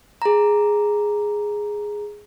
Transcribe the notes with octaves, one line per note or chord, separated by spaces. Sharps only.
G#4 A#5